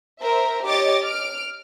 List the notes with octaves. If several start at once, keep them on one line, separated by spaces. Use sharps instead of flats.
A#4 C5 E5
G4 C#5 D#5 D6 A6
F6 D7